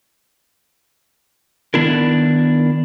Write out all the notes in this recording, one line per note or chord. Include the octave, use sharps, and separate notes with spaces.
D#3 B3 D4 E4 A#4